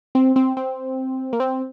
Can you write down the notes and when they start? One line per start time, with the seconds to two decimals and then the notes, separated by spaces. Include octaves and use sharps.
0.15 C4
0.36 C4
0.57 C4
1.33 A#3
1.40 C4